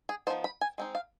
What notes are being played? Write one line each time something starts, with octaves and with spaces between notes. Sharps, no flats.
G#4
F3 B3 D#4 C5
B5
G#5
G#3 C4 D#4
F5